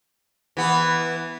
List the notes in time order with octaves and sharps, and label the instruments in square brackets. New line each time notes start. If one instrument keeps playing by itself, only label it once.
[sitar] E3 B3